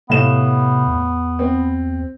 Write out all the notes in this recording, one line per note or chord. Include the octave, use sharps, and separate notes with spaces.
A2 C3 B3 F5 E7
E2
C4